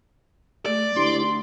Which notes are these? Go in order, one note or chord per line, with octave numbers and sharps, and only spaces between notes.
A3 D5
D2 D4 E4 G4 C6